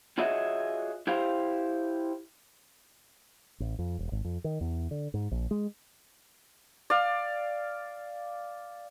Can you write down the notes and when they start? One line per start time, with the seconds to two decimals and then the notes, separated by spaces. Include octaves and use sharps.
0.18 F4 F#4 G#4 C#5 D#5 E5
1.07 E4 G4 C5 F5
3.60 A1
3.79 F2
3.99 E1
4.12 G#1
4.25 F2
4.44 D#3
4.61 E2
4.91 D3
5.14 G#2
5.31 A#1
5.51 G#3
6.90 D5 F5